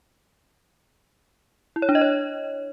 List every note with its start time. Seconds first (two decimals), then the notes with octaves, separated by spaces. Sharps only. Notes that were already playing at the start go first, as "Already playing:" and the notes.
1.76 E4
1.82 C#5
1.89 D4
1.95 D#5
2.01 C#5